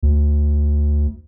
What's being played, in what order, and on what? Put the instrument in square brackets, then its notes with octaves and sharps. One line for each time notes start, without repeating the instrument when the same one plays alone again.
[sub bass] D2